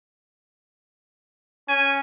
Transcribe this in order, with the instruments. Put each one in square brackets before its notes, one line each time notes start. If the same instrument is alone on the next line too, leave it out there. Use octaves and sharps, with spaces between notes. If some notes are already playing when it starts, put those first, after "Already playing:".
[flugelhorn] C#4 [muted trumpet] G#5